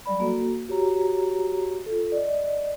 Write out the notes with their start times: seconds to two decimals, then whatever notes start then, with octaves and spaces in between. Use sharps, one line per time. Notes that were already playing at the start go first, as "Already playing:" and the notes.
0.06 F#3 G3 D5 B5
0.20 A#3 F#4 A4
0.69 F#4 G4 C#5 A#5
1.86 F4 A4
2.12 D5 D#5